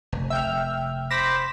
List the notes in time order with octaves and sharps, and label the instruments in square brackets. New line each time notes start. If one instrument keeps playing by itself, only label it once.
[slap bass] F1
[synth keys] E5 G5 F6
[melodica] C5 B5 D6 [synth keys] A#6 B6 E7